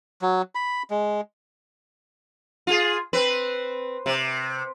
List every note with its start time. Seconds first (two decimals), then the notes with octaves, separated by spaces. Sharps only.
0.22 F#3
0.55 B5
0.90 G#3
2.67 F4 G#4
3.13 C4 B4
4.06 C3